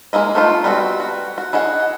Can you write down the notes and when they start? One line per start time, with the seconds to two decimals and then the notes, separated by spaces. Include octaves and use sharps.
0.13 G#3 A#3 E4 D#5
0.35 A3 B3 D#4 F4
0.64 G3 B3 C4 F4 F#4
1.00 F#4
1.38 F#4
1.53 E4 G#4 D#5 F#5